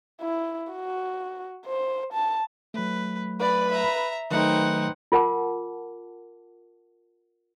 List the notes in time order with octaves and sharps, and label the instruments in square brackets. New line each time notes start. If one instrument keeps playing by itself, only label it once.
[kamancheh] E4
F#4
C5
A5
[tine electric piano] F#3 A3 [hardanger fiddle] B4
[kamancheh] B4 B5 [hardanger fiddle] D5
[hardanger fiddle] E5 A#5
[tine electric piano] D#3 F#3 A3 [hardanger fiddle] C4 F#5 [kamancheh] D#4 B4
[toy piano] F4 A#4 F#5 A5 D6